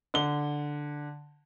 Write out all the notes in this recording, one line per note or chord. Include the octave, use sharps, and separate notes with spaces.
D3 G7